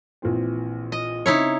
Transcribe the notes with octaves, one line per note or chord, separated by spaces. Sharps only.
A#1 E3 C4
D#5
C#3 C4 D#4 E4 C#5